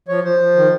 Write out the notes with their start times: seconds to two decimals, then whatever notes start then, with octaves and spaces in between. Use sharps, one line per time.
0.08 F3 C#5
0.24 F3 C5
0.40 F3
0.56 D#3